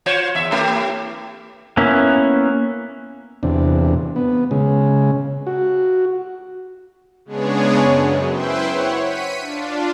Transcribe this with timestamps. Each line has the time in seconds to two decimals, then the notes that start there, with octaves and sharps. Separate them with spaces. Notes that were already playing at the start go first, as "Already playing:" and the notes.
0.06 F4 C5 C#5
0.35 E2 E5
0.52 A3 E4 G4
1.77 A#3 B3 C#4 E4
3.43 E2 C3 D4
4.16 B3
4.51 C#3 G#3
5.47 F#4
7.25 C#3 G#3 B3 D4 G#4 C#5
7.78 F#2
8.31 E4 B4 C5 E5 G5 C6
8.65 C#5 F#5
8.98 B6 C#7 D#7
9.40 D4 F4